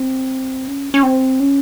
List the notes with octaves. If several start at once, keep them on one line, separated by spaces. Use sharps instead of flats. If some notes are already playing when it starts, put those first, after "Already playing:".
Already playing: C4
C#4
C#4
C4
C#4